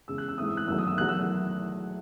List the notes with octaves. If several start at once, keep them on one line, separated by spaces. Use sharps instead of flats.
E2 C#3 G#3 E6
F#6
E6
G#2 E3 A3 C4 D#6
E6
F#6
F#1 E2 D#3 F#3 A3 E6
D#6
E6
F#1 E2 D#3 F#3 A3 F#6
E6